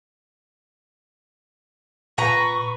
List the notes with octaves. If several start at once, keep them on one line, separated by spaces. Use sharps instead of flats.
A#2 B4 A#5 C#6